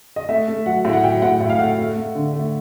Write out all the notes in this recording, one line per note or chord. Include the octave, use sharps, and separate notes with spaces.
D#5
A3 E5
A3
F#3 F#5
A2
F#5
F#3 G5
A2 F#5
A2
F5
A3 F#5
A3
A3
D3
A3